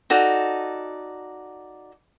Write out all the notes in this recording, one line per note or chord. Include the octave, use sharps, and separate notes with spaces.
D#4 F#4 A4 D5